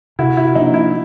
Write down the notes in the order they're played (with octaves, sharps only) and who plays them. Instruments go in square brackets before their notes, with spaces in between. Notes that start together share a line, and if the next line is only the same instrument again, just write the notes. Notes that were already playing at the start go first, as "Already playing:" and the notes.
[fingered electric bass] C3 [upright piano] E4 F#4
[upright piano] E4
[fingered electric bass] F3 A#3 D4 [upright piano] D#4
[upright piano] E4